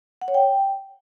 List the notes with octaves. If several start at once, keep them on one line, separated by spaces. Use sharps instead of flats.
F#5
C#5
G5